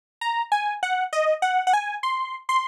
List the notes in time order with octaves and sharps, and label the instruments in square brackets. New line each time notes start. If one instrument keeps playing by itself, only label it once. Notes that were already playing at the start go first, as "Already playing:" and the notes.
[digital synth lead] A#5
G#5
F#5
D#5
F#5
F#5
G#5
C6
C6